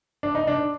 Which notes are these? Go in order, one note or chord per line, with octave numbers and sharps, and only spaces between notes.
D4
D#4
D4